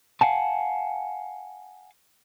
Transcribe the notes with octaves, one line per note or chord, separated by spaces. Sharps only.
F5 F#5 G#5 A5